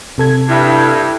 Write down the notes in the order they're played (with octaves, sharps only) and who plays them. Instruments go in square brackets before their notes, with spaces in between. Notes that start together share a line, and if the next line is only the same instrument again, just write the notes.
[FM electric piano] C3 A4 G#6
[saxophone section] G2 [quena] E4